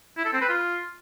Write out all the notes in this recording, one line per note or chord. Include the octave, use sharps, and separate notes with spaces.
E4
A4
C4
B4
F4